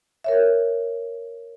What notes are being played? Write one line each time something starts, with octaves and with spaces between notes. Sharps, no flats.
A#4 C#5 E5